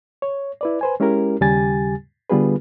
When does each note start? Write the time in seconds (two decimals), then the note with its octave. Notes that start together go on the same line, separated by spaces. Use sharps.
0.22 C#5
0.61 E4 B4 D5
0.81 B4 C5 G#5
1.00 G#3 C#4 E4 G4 A#4
1.41 D#2 C#3 G3 G4 G#5 A6
2.30 D3 G3 B3 F4 G#4 B4